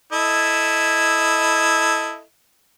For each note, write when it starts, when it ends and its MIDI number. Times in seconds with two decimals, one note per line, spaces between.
0.13 2.23 64
0.13 2.23 69
0.13 2.23 75